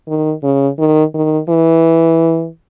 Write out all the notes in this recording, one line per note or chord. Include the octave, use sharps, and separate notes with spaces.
D#3
C#3
D#3
D#3
E3